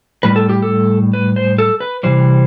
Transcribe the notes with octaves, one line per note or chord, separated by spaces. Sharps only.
A2 G3 B4
A4
G4
A4
B4
C5
A4
B4
C3 E3 G3 C5